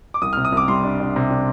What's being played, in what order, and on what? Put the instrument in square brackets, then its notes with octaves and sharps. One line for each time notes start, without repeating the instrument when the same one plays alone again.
[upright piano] D6
C2 D#6
C3 F6
D#6
C2 D6
G3 C6
D4
D4
C3
D4